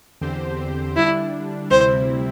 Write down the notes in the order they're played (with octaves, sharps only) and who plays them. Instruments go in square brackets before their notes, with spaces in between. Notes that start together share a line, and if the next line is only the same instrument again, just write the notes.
[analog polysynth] E2 D3 C4 G4 C5
[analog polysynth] D3 G3 D4 [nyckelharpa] E4
[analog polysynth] D2 C3 G3 C4 E4 [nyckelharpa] C5